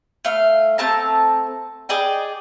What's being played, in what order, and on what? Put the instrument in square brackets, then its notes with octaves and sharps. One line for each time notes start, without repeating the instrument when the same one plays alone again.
[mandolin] A3 F5
A3 C4 A5 A#5
G#4 D5 D#5 G5